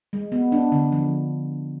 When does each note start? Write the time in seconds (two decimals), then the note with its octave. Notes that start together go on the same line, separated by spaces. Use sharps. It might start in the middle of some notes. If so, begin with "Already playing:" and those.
0.13 G#3
0.32 B3
0.52 D4
0.72 D3
0.92 F3